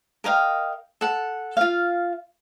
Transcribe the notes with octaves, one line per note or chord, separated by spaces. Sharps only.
A#4 D#5 F5 G5
A4 F#5
F4 F5